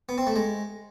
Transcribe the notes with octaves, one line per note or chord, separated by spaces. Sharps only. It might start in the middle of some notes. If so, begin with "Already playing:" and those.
B3
C4
A3
G#3